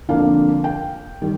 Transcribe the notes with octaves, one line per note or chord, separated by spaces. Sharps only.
F2 D3 F3 A#3 D4 F5
G5
D#3 G3